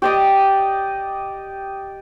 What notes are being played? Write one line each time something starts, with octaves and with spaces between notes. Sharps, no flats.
G4 D5 D#5